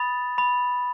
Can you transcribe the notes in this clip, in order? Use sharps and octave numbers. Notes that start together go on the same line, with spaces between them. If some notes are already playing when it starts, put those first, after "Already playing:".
Already playing: B5 D#6 A6
B5